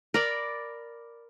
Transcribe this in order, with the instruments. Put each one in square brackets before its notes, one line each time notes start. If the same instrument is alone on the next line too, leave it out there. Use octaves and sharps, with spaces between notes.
[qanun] A#4 D5 B5